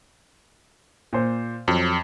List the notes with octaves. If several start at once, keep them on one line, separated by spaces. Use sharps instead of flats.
A#2 C5
F2 F#3